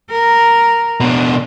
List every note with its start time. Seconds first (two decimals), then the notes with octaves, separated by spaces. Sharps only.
0.11 A#4
1.00 B2 D4